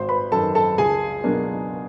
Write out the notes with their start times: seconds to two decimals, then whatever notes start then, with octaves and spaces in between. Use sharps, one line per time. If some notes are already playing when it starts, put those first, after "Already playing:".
Already playing: G#1 C5 C6
0.09 B4 B5
0.32 F#2 D#3 A4 A5
0.55 A4 A5
0.78 C#2 G#4 G#5
1.24 B2 F#3 A#3 D4